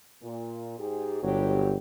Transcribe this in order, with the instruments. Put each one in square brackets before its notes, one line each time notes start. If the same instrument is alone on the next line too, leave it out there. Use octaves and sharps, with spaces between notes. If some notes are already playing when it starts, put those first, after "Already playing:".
[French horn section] A#2
G#2 G4 G#4
[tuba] G1 [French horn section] F#3 B3 G4